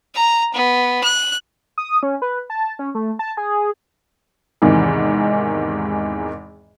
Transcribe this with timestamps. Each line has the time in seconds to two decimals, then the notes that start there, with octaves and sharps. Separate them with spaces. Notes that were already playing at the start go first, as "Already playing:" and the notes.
0.15 A#5
0.53 B3
1.03 F#6
1.78 D#6
2.03 C#4
2.22 B4
2.50 A5
2.79 C#4
2.95 A3
3.19 A5
3.37 G#4
4.62 E2 G#2 C3 D#3 E3